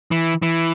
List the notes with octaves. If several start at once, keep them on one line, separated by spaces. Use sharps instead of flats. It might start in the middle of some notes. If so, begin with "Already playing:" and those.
E3
E3